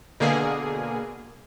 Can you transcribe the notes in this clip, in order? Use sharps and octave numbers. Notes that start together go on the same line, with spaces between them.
B2 D3 A#3 G#4